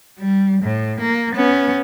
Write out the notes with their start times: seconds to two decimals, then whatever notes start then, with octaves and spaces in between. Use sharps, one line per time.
0.19 G3
0.63 A2
1.00 A#3
1.35 B3 C#4